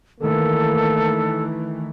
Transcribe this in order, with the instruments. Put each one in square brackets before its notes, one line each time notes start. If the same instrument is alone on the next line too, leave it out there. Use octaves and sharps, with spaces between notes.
[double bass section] D#3 E3 A3 [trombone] A#3 [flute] A4